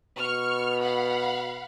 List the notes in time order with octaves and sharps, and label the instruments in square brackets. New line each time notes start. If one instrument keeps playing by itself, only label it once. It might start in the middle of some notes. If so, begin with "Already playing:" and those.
[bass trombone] B2 [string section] C#6 F6
[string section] F5 F#5 B5